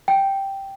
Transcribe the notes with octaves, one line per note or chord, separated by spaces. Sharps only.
G5